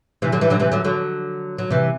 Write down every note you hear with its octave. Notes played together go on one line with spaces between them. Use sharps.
C3 E3
D3 F#3
E3 G3
D3 F#3
C3 E3
D3 F#3
D3 F#3
F#3
C3 E3